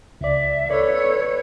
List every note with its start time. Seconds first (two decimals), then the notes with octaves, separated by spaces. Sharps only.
0.21 C#2 D5 E5
0.71 A4 B4 C#5 D5